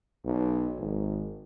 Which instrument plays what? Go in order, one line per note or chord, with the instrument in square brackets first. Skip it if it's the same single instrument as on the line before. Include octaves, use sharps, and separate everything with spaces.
[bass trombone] B1
G#1